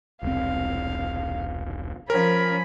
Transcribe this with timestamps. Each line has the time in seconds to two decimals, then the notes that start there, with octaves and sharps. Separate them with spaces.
0.23 E1 C2 C4 F5
2.10 F3 C#4 A#4 B5